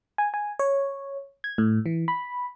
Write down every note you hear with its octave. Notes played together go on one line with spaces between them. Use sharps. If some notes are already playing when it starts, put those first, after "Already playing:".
G#5
G#5
C#5
G#6
A2
E3
B5